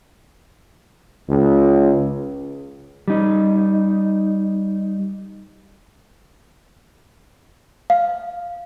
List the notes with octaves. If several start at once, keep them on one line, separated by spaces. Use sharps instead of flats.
C#2
G3 D#4
F5